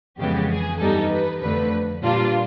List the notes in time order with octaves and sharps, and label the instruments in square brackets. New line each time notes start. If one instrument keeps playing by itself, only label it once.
[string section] F2 C#3 E3 G#3 B3 G4
G#4
G2 E3 G3 B3 D#4 A4
B4
F2 D3 F3 A3 B4
A#2 G3 A#3 D4 F4